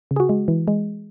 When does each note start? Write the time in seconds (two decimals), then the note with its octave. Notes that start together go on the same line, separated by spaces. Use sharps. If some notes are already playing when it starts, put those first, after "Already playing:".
0.11 C#3
0.16 G#4
0.20 F#4
0.29 G#3
0.48 E3
0.68 G#3